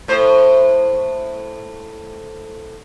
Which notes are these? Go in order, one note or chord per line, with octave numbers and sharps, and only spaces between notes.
A2 C5